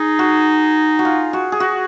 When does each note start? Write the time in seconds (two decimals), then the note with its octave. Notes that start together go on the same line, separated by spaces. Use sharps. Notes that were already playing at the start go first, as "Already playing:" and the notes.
Already playing: D#4 G#4
0.19 F#4
0.99 F#4
1.05 F4
1.33 F#4
1.52 G#4
1.60 F#4